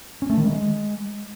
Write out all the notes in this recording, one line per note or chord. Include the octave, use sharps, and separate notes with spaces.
C#4
A3
D#3
G#3